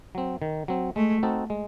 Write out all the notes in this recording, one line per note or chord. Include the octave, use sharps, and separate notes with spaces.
F#3 C4
D#3
F#3 C4
G#3 A3
C4 D#4 F#4 A4
G#3